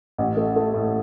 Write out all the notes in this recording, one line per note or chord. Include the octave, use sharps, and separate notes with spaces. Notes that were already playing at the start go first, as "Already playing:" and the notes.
A1
A3
A3
A2